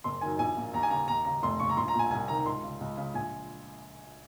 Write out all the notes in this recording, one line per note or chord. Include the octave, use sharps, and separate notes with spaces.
F#1 C6
F#2 D#3 G#5
A#1 G#5
A#2
D#2 A#5
G#5
C#3 A#5
D#2 A#5
C#3 A#5
F1 C6
D#2 C#3 C#6
A#5
A#1 C6
A#5
A#2 G#5
C2 G#5
C3 D#3 A#5
C#2 C6
C#3
C#2
C#3
A#1 G#5